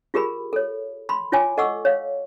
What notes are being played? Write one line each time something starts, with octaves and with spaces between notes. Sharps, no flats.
F4 G4 G#4 A#4 B5
A4 C#5
B5 C6
E4 F4 C#5 G5 G#5 D6
A4 D#5 F#5 C#6 D6 E6
C#5 F5